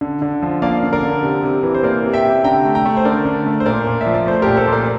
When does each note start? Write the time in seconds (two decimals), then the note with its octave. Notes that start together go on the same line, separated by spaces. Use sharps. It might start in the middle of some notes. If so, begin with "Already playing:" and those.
0.01 D3
0.22 D3
0.43 F3
0.62 A#3 D5 F5
0.83 D3
0.93 A#4 D5
1.03 D3
1.23 C3
1.43 C3
1.63 E3
1.74 C5
1.83 A#3 A#4 D5
2.04 C3
2.13 E5 G5
2.25 C3
2.44 D3 G5 A#5
2.65 A3
2.75 G5 A#5
2.85 A3
2.97 C5
3.05 D3 A#4 D5
3.25 D3
3.46 A3
3.60 C5
3.66 A#2 A#4 D5
3.87 A#2
4.01 E5
4.07 F3
4.14 D5
4.26 A3 C5
4.42 A#2 G4 A#4
4.57 A4 C5
4.67 A#2 A#4 D5